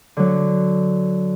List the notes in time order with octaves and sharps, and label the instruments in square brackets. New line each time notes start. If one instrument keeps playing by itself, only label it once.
[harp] D3 F#3